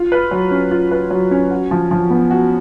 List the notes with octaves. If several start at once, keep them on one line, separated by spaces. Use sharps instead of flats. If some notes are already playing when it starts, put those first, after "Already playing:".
Already playing: F4
B4
F#3
C#4
F4
B4
F#3
C#4
F#4
F3
F3
B3
F#4